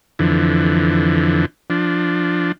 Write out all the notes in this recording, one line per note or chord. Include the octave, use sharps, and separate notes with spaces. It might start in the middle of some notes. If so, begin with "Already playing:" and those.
F2 D3 E3
F3 D4